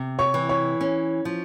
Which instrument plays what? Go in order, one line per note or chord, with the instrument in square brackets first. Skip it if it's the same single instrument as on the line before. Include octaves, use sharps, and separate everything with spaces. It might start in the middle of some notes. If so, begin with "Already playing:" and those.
Already playing: [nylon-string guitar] C3
[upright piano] C#5 C#6
[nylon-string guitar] E3
[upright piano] C#5 C#6
[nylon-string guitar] C#4
F3